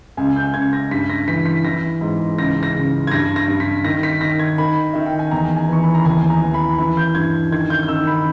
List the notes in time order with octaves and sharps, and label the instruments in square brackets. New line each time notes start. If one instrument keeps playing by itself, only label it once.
[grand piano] C#2 G#5
G6
C#2 G#6
A#6
G2 B6
A#6
E3 B6
B6
E3 A#6
G#2
C#2 A#6
A#6
C#3
G#6
G2 A#6
A#6
G2
B6
D#3 A#6
B6
D#3 A#6
G#6
D#3 B5
D#3 E5
G5
G#5
E2 A#5
G#5
E3 C#6
B5
A#5
D#2 G#5
A#5
E3
B5
E3 B5
G6
G2 G#6
D#3 G#6
G6
G6
D#3 E6
B5